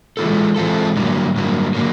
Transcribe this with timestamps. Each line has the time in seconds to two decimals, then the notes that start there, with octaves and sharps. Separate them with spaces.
0.17 E3 G#3 C4 F4 A4
0.56 E3 G#3 C4 F4 A4
0.96 G2 D3 F#3 A#3
1.36 G2 D3 F#3 A#3
1.74 D3 F#3 A#3